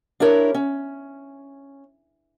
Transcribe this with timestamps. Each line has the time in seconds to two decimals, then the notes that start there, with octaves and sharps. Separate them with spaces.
0.20 D4 E4 G4 A#4 C#5
0.54 C#4